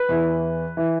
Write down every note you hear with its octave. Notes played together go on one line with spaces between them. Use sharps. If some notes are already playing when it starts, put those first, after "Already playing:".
Already playing: B4
E2 E3
E3